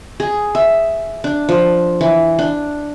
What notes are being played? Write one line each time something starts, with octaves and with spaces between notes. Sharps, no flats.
G#4
E5
D4
F3
E3
D4